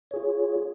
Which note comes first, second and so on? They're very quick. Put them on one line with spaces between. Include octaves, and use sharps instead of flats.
C#5 G#4 F4